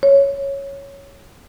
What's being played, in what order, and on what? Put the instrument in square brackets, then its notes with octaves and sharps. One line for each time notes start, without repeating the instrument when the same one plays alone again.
[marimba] C#5